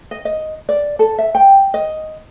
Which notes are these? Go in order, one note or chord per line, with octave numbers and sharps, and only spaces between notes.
D#5
D#5
D5
A4
E5
G5
D#5